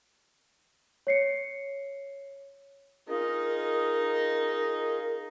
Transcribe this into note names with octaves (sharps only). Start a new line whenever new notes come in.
C#5 C7 C#7
D#4 F4 G#4 A#4 D#5